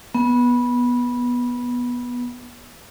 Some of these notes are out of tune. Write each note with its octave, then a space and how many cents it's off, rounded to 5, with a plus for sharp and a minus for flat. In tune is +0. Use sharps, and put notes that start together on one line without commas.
B3 -15